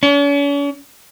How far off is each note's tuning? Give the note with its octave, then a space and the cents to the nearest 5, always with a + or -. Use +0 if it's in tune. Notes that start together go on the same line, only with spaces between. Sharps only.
C#4 +45